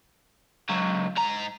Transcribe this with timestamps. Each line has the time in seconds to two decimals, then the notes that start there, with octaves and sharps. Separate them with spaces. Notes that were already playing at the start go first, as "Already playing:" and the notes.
0.69 C#2 F#3
1.17 G#2 A#5